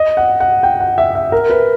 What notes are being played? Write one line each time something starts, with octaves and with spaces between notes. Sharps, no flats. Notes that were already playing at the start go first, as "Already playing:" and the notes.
Already playing: D#5
F#5
F#5
G5
F#5
E5
E5
A#4
B4